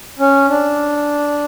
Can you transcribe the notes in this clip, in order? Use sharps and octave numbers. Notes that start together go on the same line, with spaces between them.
C#4
D4